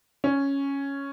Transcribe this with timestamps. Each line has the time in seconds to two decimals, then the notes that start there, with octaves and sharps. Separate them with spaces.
0.24 C#4